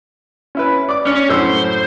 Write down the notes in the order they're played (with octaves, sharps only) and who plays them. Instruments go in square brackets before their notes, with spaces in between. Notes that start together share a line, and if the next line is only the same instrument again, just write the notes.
[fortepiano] C#4 E4 B4
D5 D6
[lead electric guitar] C#4 [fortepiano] D4
[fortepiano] F#2 A2 E6 [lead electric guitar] C5